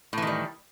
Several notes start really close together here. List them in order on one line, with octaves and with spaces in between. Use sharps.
A2 E3 D#3 G3